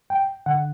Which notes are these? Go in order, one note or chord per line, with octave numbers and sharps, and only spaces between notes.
G5
D3 F#5